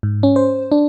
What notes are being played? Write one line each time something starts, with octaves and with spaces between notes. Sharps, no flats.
G#2
C#4
C5
D4